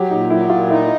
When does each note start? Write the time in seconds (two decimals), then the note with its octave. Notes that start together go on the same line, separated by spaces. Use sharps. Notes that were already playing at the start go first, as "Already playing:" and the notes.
Already playing: F#3 G4
0.10 A#2 D#4
0.30 F#3 E4
0.50 A#2 F4
0.69 D#4 E4